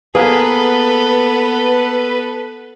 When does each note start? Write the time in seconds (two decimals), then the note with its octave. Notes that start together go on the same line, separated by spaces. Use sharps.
0.15 A#3 B3 G#4 A4 B4